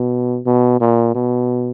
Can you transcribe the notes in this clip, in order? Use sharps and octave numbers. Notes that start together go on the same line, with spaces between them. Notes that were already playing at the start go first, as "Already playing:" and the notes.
Already playing: B2
B2
A#2
B2